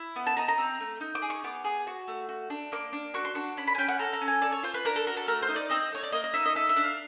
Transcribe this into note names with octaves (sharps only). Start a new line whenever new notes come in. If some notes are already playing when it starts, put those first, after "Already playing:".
Already playing: E4
B3
A5
D#4 A#5
A#5
C4
A3
D#4
D6
G#4
C#6
B3 D6
G#4
F#4
A3
F#4
D4
A#3 D6
D4
F#4 C#6
C6
D4 C#6
C#4 B5
B5
G#5
C#4 G5
F#5
A4 A#5
A#5
C#4
G#5
A4 D5
C#5
F4 C5
B4
D4 A#4
A4
F#4 A#4
A4
A3 A#4
C5
D#4
D5
C4 D#5
A3 C#5
D5
A#3 D#5
D#5
D#4 E5
D#5
A4 E5
E5
D4
F5